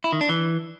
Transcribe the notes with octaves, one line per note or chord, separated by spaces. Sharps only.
E4
D#3
D4
E3